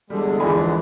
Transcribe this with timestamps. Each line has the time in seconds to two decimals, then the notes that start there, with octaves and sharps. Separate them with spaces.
0.10 E2 D3 G3 G#3 A4
0.40 D#2 E3 F3 D5 G#5 B5